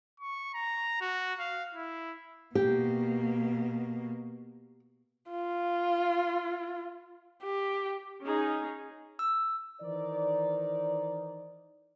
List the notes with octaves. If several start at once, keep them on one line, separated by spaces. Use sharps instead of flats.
C#6
A#5
F#4
F5
E4
B2 A#3 G4
F4
G4
C#4 D#4 G#4
E6
D#3 E3 D#4 A#4 C5 D5